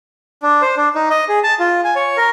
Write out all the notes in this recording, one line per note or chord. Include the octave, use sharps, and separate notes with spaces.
D4
C5
D4
D#4
D#5
G#4
A5
F4
G#5
C#5
A#4